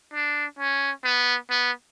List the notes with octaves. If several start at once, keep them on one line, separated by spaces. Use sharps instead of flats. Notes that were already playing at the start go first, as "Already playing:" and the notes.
D4
C#4
B3
B3